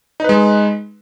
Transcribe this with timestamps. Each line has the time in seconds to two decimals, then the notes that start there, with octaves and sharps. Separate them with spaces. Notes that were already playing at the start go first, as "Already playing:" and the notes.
0.20 D#4
0.24 B4
0.29 G#3